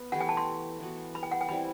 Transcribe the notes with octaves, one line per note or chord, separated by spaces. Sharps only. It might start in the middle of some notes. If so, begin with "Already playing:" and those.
Already playing: B3
E3 A3 E4 G4 F#5
G5
A5
C6
E3 B3 F#4
B5
G5
F#5
G5
E3 G3 C4 E4 B5